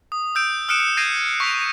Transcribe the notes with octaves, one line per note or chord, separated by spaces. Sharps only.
D#6
E6 G6 D7
D#6 F6 F#6 C#7 D7 E7
C#7
G6 G#6 A#6 C7 D7 D#7
C#6 B6 F7